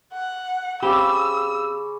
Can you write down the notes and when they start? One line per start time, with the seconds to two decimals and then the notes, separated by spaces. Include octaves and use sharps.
0.13 F#5
0.83 C#3 C4 G4 B5 D6 E6